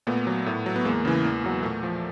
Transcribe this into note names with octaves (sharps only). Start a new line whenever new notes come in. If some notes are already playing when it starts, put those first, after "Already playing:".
A#2 A3 B3
F#3
A2
F#3
B3
E2 G#3 A#3
C#3 E3
E2
B2 F#3
A#2 A3
F3